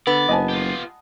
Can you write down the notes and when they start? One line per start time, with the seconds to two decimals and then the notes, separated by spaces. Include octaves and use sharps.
0.07 D3 B3 D5
0.29 F#1 D#5 G#5 A5
0.49 F4 G4